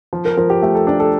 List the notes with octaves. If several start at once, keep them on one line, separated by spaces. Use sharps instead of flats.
F3
A#4
F3 A#4
G4
A3 G4
A4
D4
A4